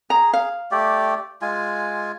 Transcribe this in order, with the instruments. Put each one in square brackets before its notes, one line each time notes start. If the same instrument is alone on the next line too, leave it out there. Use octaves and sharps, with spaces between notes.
[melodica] G#4 [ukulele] A#5
[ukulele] F5
[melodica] A3 G4 D5
G#3 F4 G#5